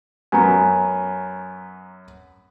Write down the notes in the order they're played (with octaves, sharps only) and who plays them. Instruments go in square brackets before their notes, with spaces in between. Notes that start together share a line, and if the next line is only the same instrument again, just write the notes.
[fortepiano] F#2 F#3 B3 [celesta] G#5 A#5